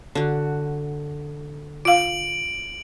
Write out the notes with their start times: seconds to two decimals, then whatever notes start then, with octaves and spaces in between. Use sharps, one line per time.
0.15 D3 F#4
1.85 F4 F5 D7 F#7